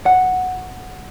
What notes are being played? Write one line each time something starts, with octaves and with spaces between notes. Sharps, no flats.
F#5